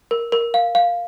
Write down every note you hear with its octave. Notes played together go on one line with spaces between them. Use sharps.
A#4
A#4
F5
F5